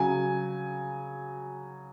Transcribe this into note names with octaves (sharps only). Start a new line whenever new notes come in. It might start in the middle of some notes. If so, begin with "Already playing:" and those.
Already playing: C#3 F#3 G#5